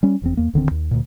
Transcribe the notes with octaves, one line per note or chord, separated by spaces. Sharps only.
G3 C#4
F1 E2 C4
E2 A#3
D1 D3 D#3 C4
D#2
D2 A#2